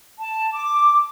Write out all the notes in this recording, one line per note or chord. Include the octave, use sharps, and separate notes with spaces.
A5
D6